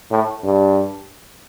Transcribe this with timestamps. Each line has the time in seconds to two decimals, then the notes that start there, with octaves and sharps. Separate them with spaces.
0.11 A2
0.43 G2